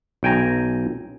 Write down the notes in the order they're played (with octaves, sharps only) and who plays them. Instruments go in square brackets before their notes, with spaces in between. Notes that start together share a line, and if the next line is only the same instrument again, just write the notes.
[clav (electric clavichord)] B1 G5 G#5 A#5